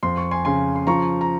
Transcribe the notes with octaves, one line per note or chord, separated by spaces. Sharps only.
F2 C6
C#6
G#5 C6
C#3 G#5 C6
C6
F3 A#5 C#6
A#5